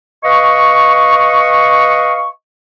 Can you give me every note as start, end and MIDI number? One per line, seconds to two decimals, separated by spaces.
0.24 2.29 71
0.24 2.29 75
0.24 2.29 77
0.24 2.29 85